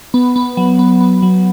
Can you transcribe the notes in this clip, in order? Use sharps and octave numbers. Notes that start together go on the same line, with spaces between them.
B3
B3
F#3
B3
B3
F#3